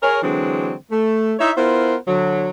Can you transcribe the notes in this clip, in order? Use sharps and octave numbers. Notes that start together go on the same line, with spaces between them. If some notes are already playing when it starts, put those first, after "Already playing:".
G#4 A#4 C#5
D3 E3 F#3 G#3 C4 D4
A3
D#4 E4 C#5 D#5 E5
B3 E4 F4 A#4 C5
D3 F#3